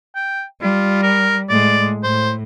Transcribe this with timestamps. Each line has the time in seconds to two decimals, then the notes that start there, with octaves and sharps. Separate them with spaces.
0.15 G5
0.62 G3 F4
1.03 A#4
1.49 A2 G#3 D5
2.03 A2 C5